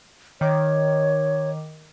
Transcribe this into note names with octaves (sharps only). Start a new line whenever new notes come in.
D#3 C#5 D6